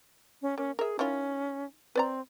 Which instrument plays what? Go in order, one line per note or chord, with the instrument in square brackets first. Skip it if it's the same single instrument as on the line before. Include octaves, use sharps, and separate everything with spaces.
[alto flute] C#4
[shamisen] A#3 [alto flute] C#4
[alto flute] G#4 [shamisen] A#4 E5
[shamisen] D#3 E4 F4 [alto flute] C#4
[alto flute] C4 [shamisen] B4 D5 A#5